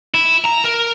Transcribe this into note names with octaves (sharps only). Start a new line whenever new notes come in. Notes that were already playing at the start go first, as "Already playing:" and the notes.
E4
A#5
A#4